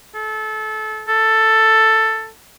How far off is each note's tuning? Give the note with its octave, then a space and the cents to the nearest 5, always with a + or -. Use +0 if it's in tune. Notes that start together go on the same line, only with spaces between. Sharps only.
A4 -25
A4 +10